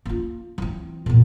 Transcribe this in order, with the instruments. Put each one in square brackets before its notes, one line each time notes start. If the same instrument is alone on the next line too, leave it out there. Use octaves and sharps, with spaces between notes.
[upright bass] A#3 F4
E3 C4
E2 A#2